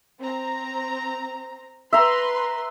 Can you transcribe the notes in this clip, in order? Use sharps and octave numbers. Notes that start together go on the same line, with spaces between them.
C4 A#5
B4 E5 A#5 C6